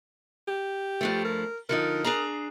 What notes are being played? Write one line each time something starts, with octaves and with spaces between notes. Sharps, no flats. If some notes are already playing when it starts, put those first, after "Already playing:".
G4
G2 F3 A3
A#4
D3 F3 D#4 A#4
D4 G#4 A#5